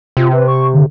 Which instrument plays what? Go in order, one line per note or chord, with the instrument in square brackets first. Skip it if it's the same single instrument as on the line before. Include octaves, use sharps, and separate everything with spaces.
[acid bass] C3 [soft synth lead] F4
[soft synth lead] B4
C#6
D3